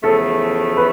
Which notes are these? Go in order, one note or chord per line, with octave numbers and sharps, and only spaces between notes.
E2 C#3 F3 A3 A4
B4